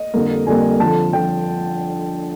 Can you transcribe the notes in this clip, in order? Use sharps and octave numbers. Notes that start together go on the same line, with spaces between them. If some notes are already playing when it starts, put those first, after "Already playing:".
Already playing: D#5
F2 D3 G3 A#3
F2 D3 G3 A#3 G#5
F2 D3 F3 A5
D3 F3 G5